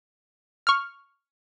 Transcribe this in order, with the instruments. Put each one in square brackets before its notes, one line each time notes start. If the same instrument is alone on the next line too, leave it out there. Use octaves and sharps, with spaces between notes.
[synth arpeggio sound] C#6 F6